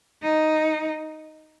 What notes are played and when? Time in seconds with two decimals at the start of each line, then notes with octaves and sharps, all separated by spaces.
0.22 D#4